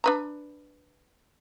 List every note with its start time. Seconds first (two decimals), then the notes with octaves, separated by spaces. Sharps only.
0.04 D4 B4 A#5